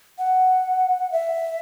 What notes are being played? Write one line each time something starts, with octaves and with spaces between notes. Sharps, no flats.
F#5
E5